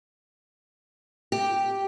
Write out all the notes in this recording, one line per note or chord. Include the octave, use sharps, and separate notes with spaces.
G4